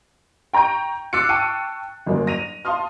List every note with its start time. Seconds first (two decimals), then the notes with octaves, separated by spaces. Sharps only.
0.53 G5 A#5 C#6 G6 D7
1.13 D6 E6 F#6 A6 C7 C#7
1.29 G5 A5 C#6 E6 C#7 D#7
2.06 G1 F#2 A#3 C#4
2.27 A#6 D#7 F7
2.65 F5 A5 C6 D#6 F6